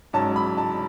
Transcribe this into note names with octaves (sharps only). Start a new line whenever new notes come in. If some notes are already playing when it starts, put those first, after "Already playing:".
G#2 F#3 C#4 A5
B5
A5